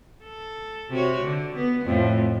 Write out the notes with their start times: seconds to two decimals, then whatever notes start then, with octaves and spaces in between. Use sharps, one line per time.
0.24 A4
0.90 C3 F#4 C#5
1.22 D3
1.56 B3
1.84 F2 A2